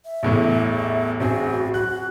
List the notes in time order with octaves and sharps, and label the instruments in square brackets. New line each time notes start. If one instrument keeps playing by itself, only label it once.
[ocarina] E5
[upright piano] A1 E2 A2
[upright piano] A1 C4 G#4 [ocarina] F#4
[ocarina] F#4 [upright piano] F#6